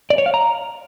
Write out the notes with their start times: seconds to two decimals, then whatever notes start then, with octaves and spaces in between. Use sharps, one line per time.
0.10 D5
0.18 C#5
0.26 F5
0.34 A#5